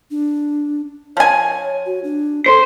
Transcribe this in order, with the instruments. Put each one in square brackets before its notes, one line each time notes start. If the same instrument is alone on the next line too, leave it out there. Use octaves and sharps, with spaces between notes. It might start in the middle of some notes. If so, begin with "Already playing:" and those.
[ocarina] D4
[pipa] F3 G#5 [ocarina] C#5
[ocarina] F#4
D4
[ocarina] A4 [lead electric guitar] C5